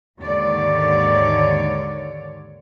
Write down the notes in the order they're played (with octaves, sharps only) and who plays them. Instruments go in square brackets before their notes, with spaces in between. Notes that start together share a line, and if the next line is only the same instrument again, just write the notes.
[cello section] D#2 G#2 D3 C#5 D5